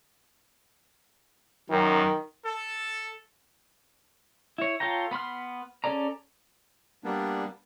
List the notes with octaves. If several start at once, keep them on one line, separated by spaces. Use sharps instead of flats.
F#2 D#3
A4
E4 C#5
F4 A4 C#5 G5 A#5
B3 B5 C6 F6
C#4 G#4 A4 D5 A#5
G3 A#3 B3 D4